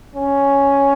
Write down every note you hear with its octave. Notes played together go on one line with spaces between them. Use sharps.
C#4